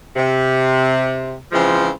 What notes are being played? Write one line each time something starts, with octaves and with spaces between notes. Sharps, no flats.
C3
C#3 E3 F3 G#3 C4